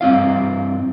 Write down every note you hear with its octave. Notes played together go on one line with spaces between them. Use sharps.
G2 C4 E4 F5